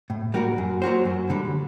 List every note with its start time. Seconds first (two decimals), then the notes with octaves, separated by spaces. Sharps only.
0.10 A2
0.34 G3 A#3 F#4 A#4
0.58 F#2
0.82 F#3 A#3 F#4 C5
1.06 F#2
1.30 D3 G3